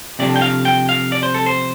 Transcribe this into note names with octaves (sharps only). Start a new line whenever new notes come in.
C3 F3 A3 D4 D5
G5
F5
G5
F5
D5
C5
A4
C5